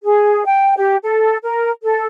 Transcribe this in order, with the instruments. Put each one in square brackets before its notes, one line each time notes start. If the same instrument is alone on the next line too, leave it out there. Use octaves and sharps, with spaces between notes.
[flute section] G#4
G5
G4
A4
A#4
A4